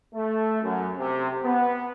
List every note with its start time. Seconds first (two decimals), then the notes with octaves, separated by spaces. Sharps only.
0.14 A3
0.63 F#2
0.97 C3
1.43 B3